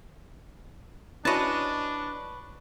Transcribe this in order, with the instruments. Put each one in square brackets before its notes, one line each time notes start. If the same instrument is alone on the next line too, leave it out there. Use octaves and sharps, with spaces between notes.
[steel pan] C#4 E4 F#4 [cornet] D4 [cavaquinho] B4 C#5 [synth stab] D#5 A5